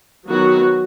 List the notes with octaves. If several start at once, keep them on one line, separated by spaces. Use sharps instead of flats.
D#3 F#3 B3 F#4